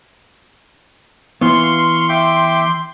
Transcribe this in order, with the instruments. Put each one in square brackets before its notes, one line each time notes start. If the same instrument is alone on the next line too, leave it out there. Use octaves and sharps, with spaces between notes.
[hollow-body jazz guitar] E3 B3 [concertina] F5 C#6 [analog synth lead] C6
[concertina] E5 G5 D6